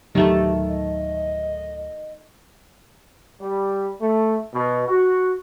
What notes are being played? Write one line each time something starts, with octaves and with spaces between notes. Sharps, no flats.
D1 C2 D#3 F#3 A3 G4 A4
D#5
G3
A3
B2
F#4